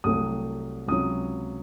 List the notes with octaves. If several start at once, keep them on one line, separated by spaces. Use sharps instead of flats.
C2 C3 F#3 A3 D#6
C#2 C3 F#3 D#6